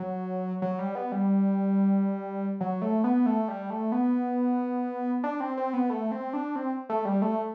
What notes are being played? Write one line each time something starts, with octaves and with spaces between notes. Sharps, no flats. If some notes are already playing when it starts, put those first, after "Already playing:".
Already playing: F#3
F#3
G3
B3
G3
F#3
A3
B3
A3
G3
A3
B3
D4
C4
C4
B3
A3
C4
D4
C4
A3
G3
A3